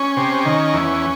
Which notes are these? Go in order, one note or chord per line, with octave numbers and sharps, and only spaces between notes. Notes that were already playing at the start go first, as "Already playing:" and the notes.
Already playing: C#4
C3
D#3
E2